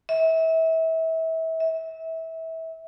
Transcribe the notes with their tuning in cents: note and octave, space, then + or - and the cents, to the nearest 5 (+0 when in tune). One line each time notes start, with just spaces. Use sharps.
E5 -30
E5 -25